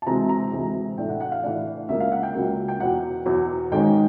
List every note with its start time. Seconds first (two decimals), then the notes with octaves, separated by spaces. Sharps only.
0.02 A5
0.06 D2 C3 E3 G#3 C4 A#5
0.29 A#5
0.52 D2 C3 E3 G#3 C4
0.97 A2 E3 A3 D4 G5
1.09 F#5
1.21 F#5
1.32 F5
1.43 A2 E3 A3 D4
1.89 C#2 C#3 F#3 A#3 E5
2.00 F5
2.12 F#5
2.23 G5
2.35 C#2 C#3 F#3 A#3
2.68 G5
2.80 E2 B2 F#3 F#5
3.26 E2 B2 F#3
3.71 G#2 D#3 G#3 C#4 G5